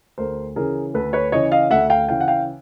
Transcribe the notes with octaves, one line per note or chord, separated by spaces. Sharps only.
D2 A#4 C5
C#3 E3 G#4 A#4
D2 A4 B4
B4 C#5
C#3 E3 C#5 D#5
D#5 F5
D2 E5 F#5
F5 G5
C#3 E3 F5 G5
F#5
F5 G5